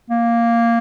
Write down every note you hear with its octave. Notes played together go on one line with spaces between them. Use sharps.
A#3